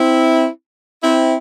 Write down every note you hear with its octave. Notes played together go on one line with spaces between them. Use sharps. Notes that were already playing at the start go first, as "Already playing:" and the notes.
Already playing: C4 E4
C4 E4